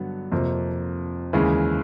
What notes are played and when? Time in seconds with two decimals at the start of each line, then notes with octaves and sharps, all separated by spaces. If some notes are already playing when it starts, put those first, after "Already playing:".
Already playing: G2 D3 F#3 B3
0.32 F2 C3 F3 A#3
1.33 D#2 C#3 E3 G#3